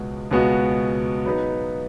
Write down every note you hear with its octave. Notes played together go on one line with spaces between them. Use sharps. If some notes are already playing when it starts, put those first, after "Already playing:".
Already playing: C#2 B2 G#3 B3 F#4
C#2 B2 G#3 B3 F#4
F#3 B3 D#4 G#4 B4